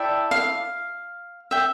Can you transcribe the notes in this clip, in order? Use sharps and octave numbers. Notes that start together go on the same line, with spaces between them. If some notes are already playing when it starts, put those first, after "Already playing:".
Already playing: E4 A4 D5 E5 G5
F5
E5 G5